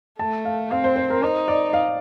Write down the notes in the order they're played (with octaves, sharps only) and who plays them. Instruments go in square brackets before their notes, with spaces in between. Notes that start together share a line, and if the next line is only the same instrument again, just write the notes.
[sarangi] A3 [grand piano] A5
[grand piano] F5
[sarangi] C4 [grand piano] F5
[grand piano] C5
C5
A#4
[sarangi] D#4 [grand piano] C5
[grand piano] D5
F5